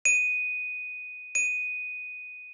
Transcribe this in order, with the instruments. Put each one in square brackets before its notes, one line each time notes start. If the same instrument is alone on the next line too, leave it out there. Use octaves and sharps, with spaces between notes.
[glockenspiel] D#7
D#7